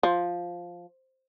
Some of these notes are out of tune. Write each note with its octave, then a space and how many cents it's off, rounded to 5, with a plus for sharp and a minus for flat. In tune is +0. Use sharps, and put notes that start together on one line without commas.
F3 +5